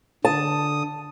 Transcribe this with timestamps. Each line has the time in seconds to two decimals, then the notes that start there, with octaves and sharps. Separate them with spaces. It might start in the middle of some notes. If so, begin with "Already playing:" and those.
0.25 D3 A5 D#6